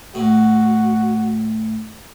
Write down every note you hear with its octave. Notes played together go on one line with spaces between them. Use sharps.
A2 F#4